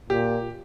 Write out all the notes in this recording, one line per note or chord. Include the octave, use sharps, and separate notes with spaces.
A#2 G4